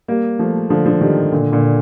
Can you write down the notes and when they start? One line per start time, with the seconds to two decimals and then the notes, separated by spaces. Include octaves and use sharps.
0.08 G3 A#3
0.39 F3 A3
0.70 D3 F3
0.86 D3 F3
1.01 D#3 G3
1.32 A#2 D3
1.52 A#2 D3